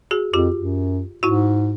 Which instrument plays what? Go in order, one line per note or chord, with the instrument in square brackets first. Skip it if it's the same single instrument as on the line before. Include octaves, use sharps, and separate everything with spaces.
[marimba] F#4 G#4
[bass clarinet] F2 [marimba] F4 G4
[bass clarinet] F#2
[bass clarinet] G#2 [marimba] E4 F#4